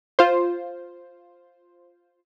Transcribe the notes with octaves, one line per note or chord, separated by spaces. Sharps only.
F4 C5